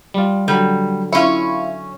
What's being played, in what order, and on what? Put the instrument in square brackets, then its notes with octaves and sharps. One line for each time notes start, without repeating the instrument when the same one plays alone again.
[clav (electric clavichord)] G3 F4
[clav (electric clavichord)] D3 F#3 [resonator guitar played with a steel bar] G3
[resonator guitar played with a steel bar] C#4 C#5 [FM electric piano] E4 F4